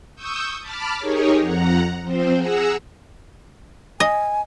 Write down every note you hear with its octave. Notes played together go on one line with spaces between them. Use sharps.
C#6 D#6 E6 G6
A5 B5 D6 F6
D#4 G4 G#4 A#4 C#5
F2 F#5 A#5
F3 C4 C5
G#4 F#5 A#5 E6
D#5 G#5